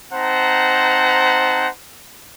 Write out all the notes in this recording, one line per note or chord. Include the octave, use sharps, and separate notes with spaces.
C4 D#4 C5 F#5 A5 A#5